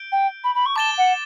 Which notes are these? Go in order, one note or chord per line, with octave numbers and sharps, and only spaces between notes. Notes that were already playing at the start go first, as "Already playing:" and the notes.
Already playing: G6 D7 G7
G5
B5
B5
C#6
A5 D6 A6 E7 G7
F#5